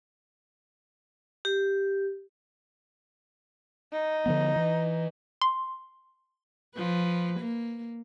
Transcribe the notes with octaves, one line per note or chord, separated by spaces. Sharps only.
G4
D#4
D3 F3 B3
E3
C6
F3 B4
A#3